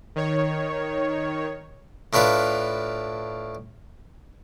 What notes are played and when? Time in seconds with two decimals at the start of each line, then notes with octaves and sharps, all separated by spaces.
0.16 D#3 C#5
2.13 A2 D4 F4 B4 F5